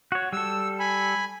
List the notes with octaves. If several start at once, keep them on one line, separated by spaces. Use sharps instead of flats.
F#4 C#5
G3 A4 E6
G#5 B5